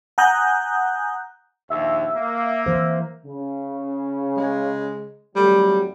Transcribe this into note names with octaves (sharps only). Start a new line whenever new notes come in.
F#5 G#5 A#5 D#6 F#6 G6
A#1 D#2 E5
A#3
E3 C5
C#3
G#3
G#1 F#3 G3 A3